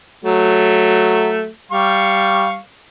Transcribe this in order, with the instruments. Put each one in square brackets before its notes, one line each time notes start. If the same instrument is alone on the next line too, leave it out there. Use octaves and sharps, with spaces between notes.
[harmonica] F#3 A3
G3 F5 C#6